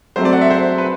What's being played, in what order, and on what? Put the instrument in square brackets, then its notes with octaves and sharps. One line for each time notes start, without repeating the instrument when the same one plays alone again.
[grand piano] F#3 A3 C4 C5
D5
F#5
E5
C5
B4